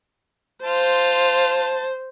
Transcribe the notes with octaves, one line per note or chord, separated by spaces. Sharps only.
F4 C5 A5